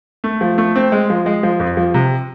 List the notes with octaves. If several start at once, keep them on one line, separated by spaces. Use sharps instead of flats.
A3
F3
A3
C4
G#3
F3
G#3
F3
F2
F3
C3